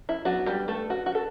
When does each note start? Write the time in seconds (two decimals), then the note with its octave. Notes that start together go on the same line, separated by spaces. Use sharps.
0.09 E4
0.25 F#3 B3 D4 F#4
0.46 G3 G4
0.68 A3 A4
0.90 F#4
1.06 F#4
1.15 A4